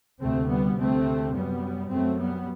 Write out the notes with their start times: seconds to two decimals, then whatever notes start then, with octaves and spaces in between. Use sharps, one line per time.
0.22 D2 C3 A3 C4
0.50 G3 B3
0.78 D2 C3 A3 C4
1.35 F#2 G3 B3
1.92 F#2 A3 C4
2.20 G3 B3